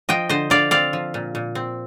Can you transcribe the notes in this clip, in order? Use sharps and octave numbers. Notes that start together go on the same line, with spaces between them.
F3 D#5 G5
D3 C5 D#5
D3 D5 F5
C4 D5 F5
F3
A#2
A#2
C4